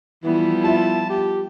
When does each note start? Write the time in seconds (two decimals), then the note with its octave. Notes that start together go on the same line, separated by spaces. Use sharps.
0.23 E3 F3 G3 B3 E4
0.64 F4 E5 A5
1.10 G4